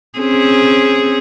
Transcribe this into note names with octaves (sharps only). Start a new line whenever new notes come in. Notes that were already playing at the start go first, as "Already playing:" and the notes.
C4 C#4 G#4